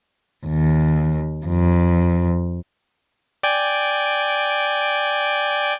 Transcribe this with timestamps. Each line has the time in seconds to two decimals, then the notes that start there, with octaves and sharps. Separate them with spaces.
0.47 D#2
1.46 F2
3.43 D5 G5 G#5